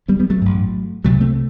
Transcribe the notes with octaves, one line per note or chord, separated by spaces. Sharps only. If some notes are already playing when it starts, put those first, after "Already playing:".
G3 B3
G3 B3
F#3 A3
A1 G2
C2 C3 F#3 A3
A3 C4